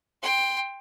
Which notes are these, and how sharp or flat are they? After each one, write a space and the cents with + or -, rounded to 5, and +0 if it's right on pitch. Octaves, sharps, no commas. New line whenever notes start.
G5 +15 C6 +0